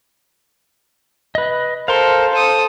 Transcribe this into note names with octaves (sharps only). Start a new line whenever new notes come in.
B4 D#5
A4 A#4 C5 F5 C6
A4 C5 D#6